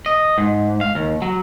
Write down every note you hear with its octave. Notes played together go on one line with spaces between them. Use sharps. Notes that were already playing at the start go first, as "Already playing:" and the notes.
D#5
G#2
F5
D#2
F#3